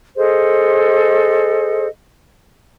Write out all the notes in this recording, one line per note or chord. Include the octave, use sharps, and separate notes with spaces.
G#4 A4 C5 D#5